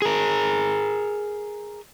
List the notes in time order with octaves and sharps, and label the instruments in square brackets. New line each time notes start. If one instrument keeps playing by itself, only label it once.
[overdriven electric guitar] G#4 A#4